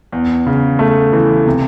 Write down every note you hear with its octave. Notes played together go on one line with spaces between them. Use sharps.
E2
C#3
A3
E3
C3